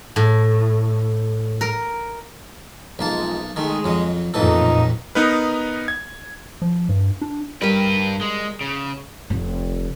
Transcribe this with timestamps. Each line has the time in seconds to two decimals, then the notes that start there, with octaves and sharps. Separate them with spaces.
0.16 A2
1.61 A#4
2.99 B1 F3 G#3 A#3 A5
3.56 D#3 G#3 A3
3.84 F2 F#3
4.34 A1 F2 A#2 E3 F#3 A#3 D#4 A4
5.15 B3 D#4 A#4 B4
5.88 G#6
6.62 F3
6.89 G2
7.22 D4
7.62 G2 G3 A#4 B4
8.21 G#3
8.61 C#3
9.30 F1 D#3